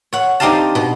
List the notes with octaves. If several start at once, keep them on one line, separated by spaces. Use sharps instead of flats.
C#5 F#5
C4 D4 D#4 G4 F5 A5
B2